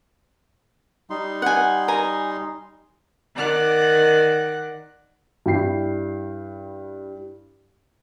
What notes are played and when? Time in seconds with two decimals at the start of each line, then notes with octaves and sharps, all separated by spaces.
1.10 G3 D#4 C6
1.42 F#5 G#5
1.88 G#5 A#5
3.35 D#3 D5 F#5 F#6
5.46 G2 E4 G5 C7